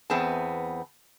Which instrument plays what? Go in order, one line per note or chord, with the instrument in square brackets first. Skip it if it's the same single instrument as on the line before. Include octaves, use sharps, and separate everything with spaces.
[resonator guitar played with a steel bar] E2 B3 C4 G#4 A5